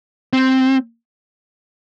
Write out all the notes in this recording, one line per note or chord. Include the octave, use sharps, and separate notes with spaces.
C4